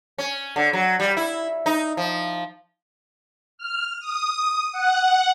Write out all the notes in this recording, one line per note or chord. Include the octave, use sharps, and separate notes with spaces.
C#4
D3
F#3
G3
E4
D#4
F3
F6
D#6
F#5